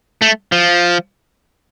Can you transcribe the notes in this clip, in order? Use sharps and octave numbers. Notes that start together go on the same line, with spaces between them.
A3
F3